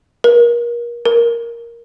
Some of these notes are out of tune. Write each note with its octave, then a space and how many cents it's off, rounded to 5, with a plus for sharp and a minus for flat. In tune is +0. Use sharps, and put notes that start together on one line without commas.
A#4 +30
A#4 +5